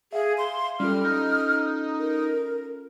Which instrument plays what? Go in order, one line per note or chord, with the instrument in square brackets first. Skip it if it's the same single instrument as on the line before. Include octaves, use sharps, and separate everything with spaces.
[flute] G#4 [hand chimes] E5 F5
[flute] C6
[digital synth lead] G3 [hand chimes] C#4 F4 A4 [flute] F6
[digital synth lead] D#4
[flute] A#4